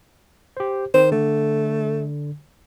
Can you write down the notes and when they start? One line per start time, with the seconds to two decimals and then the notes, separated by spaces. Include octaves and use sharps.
0.57 G4 C5
0.94 D#3 C5
1.12 D3 A3